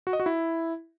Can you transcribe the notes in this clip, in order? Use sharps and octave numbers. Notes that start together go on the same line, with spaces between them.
F#4
D#5
F#4
E4